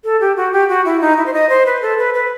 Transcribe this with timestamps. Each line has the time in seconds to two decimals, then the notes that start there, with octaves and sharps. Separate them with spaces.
0.04 A4
0.21 G4
0.37 F#4
0.53 G4
0.69 F#4
0.85 E4
1.01 D#4
1.17 E4
1.26 C5
1.33 D#5
1.49 C5
1.66 B4
1.82 A4
1.98 B4
2.14 B4